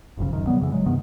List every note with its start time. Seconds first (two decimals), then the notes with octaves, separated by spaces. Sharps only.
0.17 F#1 B1 F2 C#3
0.33 D1 F#2 D#3
0.47 B2 F#3 G3 B3
0.60 F2 C#3 E3
0.72 D#1 F#3 G#3
0.86 G2 C3 D#3 B3